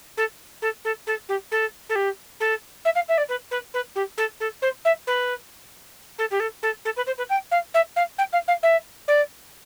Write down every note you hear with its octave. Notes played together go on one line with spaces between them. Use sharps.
A4
A4
A4
A4
G4
A4
A4
G4
A4
E5
F5
E5
D5
B4
B4
B4
G4
A4
A4
C5
E5
B4
A4
G4
A4
A4
A4
B4
C5
B4
G5
F5
E5
F5
G5
F5
F5
E5
D5